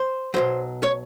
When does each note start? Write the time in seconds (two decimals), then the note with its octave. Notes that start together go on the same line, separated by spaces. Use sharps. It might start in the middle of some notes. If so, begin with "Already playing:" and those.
Already playing: C5
0.34 B1 B2 F#3 C5
0.83 C#5